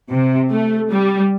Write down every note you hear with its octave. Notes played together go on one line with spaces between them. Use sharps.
C3
A3
G3